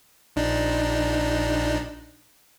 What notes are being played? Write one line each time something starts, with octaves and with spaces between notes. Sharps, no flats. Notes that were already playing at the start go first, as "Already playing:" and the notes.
A#1 D4 D#4